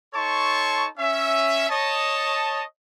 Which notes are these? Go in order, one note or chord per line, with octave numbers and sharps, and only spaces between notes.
D#4 A4 C#5 A5 C6 C#6
C#4 E5
C#5 D#5 A5